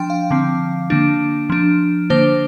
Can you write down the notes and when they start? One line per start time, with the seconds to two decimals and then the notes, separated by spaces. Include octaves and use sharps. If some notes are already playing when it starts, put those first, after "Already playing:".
Already playing: F3 D4 G5 C6
0.10 F5
0.31 D3 F3 C4
0.90 D3 A#3 D4
1.50 F3 D4
2.10 D3 A#3 D4 C5